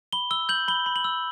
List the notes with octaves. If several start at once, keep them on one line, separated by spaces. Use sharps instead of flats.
B5 G7
E6 G7
G6 F#7
B5 G7
B5
F#7
E6